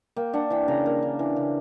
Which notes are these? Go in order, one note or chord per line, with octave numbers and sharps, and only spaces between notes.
A#3 G5
D4 F#5
E3 G5
C#3 A#5
A#3
D4
E3
C#3